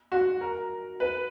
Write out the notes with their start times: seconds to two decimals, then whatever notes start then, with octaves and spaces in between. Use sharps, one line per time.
0.12 F#4
0.41 A#4
1.00 B4